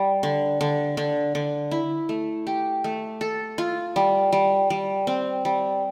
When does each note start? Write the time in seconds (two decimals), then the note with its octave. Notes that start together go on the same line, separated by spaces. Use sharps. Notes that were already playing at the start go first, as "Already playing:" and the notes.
Already playing: G3
0.23 D3
0.61 D3
0.97 D3
1.35 D3
1.71 E4
2.09 A3
2.47 G4
2.84 A3
3.21 A4
3.58 F4
3.96 G3
4.32 G3
4.70 G3
5.07 C4
5.45 G3